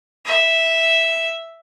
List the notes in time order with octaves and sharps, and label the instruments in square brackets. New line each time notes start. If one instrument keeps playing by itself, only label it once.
[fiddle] E5